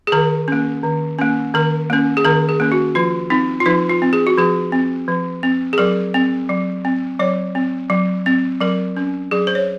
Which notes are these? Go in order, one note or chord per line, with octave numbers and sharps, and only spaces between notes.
G#4
D#3 A#4
A#3 C#4
D#3
A#3 C#4
D#3 A#4
A#3 C#4
G#4
D#3 A#4
G#4
A#3 C#4
F#4
F3 F4
C4 D#4
F4
F3 D#4
F4
C4
G#4
F#4
F3 G#4
C4
F3
C4
G#4
F#3 A#4
C4
F#3
C4
F#3 C#5
C4
F#3
C4
F#3 A#4
C#4
F#3 G#4
C5
C#5